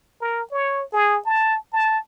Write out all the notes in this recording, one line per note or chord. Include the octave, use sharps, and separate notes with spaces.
A#4
C#5
G#4
A5
A5